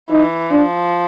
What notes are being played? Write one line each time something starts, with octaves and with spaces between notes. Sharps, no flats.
E3 D#4
F3 D4